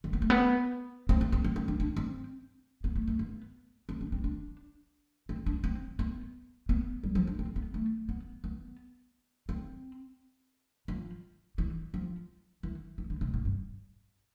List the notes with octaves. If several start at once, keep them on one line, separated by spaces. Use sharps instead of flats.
D3
B3
A3
B3
C4
C4
C4
C4
C4
D4
D4
C4
B3
A3
A3
B3
C4
D4
C4
D4
C4
D4
C4
B3
B3
G3
F3
D4
C4
B3
A3
B3
B3
C4
F3
E3
F3
E3
E3
D3
C3
B2
G2